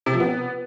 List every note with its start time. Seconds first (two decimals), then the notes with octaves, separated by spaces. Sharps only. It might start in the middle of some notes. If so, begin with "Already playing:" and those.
0.06 C3
0.13 F3
0.20 B3